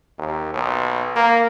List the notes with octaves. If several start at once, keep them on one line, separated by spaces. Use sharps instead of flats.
D#2
B1
A#3